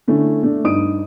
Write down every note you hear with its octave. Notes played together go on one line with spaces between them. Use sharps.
D3 A3 C#4 E4
A3 D4
G2 D#4 D#6 D7